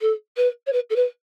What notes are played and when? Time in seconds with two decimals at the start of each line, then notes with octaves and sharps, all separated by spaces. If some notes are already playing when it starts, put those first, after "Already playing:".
0.01 A4
0.36 B4
0.66 C#5
0.72 B4
0.90 A4
0.96 B4